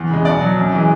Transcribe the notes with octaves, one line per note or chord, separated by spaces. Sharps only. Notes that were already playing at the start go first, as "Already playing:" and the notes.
Already playing: E2
C#3 G#3
B2 D5
F#3
F#2
E3 G#3